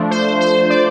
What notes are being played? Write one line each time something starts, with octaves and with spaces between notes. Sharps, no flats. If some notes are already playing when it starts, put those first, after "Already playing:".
Already playing: F3 A3 D4
C5
C5
D5